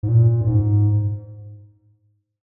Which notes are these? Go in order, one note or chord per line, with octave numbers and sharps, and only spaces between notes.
G#2
A#2
F#2
G#2